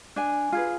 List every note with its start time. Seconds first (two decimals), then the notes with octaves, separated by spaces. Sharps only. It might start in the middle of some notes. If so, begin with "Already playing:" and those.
0.16 D4 G#5
0.52 F4 G#4 B4